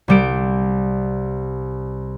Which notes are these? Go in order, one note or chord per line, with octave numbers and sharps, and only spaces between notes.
C2 G3 D7